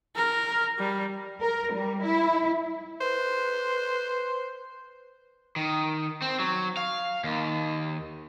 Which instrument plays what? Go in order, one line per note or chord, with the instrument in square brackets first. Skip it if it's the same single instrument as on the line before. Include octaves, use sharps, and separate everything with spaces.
[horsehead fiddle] A#4
G3
[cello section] A#4
G3
E4
[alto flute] B4 [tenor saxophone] C5
[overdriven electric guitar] D#3
C4
F#3
F5
D#2